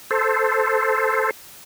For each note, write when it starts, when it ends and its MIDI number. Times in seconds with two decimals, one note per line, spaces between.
0.11 1.31 69
0.11 1.31 72